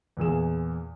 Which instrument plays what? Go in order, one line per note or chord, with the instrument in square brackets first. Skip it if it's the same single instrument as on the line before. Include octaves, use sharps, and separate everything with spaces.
[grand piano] E2 A#2 G#4 E7